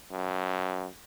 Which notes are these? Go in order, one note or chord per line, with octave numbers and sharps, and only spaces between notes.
F#2